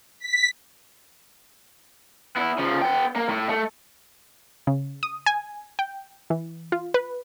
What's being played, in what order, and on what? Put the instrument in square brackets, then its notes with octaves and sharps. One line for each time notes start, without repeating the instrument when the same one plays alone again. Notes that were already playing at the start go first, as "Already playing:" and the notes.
[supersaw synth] B6
[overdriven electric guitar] B3 E4
C#3 F3
B3 G5
A#3
A2
A3
[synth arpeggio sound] C#3
D#6
G#5
G5
E3
F4
B4